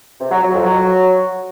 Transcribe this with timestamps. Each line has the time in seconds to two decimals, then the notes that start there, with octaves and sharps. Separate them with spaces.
0.21 C3
0.32 F#3
0.43 F#3
0.54 F2
0.65 F#3